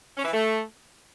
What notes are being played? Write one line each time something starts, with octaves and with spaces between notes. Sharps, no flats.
C#4
E3
A3